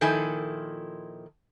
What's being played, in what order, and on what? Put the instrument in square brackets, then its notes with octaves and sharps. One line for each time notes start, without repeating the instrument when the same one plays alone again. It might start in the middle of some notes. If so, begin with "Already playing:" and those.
[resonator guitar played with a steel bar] A#2 D#3 F3 E4 A4 G#5